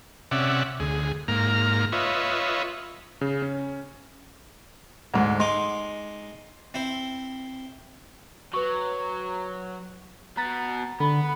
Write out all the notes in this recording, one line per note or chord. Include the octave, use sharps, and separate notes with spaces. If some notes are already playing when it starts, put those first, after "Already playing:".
C3 C#4 D5 E5 F#5
D2 G#4
G#2 A#3 A#5 F6
F4 B4 C#5 D#5 E5
C#3
C#4
D2 G#2
G#3 D#4 C6 D6
C4 E4 C5
F#3 B4 C#6
B2 B3 A#5 A6
D3 B3 B5